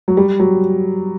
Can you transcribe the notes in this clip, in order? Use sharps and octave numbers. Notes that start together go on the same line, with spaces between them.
F#3
G3
F#3